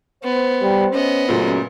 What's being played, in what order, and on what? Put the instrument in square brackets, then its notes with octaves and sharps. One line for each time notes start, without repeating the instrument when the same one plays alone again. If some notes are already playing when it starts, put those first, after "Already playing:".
[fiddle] B3 [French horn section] C5
[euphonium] G3
[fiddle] B3 D#5 [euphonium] C#4
[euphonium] F#2 [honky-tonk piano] A#2 C#3 A3